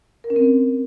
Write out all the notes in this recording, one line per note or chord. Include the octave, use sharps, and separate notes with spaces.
A#4
C#4
C4